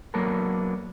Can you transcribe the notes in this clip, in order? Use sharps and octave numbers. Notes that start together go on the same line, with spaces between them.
F#3 A#3 B3 D4 A4 A#4